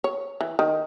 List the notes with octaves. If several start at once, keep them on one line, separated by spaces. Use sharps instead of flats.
C#5
E3
D#3